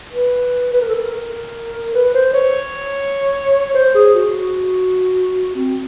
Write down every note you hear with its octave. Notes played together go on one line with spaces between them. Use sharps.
B4
B4
A#4
A4
A#4
B4
C5
C#5
C5
G#4
F#4
C4